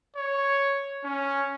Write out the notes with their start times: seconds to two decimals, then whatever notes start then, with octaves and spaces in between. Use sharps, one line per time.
0.16 C#5
1.05 C#4